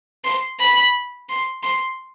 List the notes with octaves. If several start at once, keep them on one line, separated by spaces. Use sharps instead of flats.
C6
B5
C6
C6